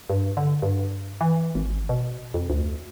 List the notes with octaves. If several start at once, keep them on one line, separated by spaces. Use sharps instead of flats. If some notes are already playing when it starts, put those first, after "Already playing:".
G2
D3
G2
E3
G#1
B2
F2
D2